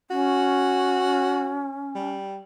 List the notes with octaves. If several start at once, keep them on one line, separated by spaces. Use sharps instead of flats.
C#4 F#4
G3